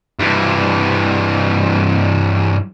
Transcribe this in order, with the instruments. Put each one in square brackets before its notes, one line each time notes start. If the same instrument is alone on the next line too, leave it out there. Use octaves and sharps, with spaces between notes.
[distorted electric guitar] G2 E3